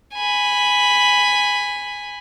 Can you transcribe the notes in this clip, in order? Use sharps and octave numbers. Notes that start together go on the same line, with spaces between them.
G#5 B5